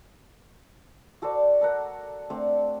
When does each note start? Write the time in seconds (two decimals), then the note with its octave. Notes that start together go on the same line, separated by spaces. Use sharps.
1.22 F#4 A4 C5 D5
1.61 A4 A#4 F#5
2.30 A3 C4 D4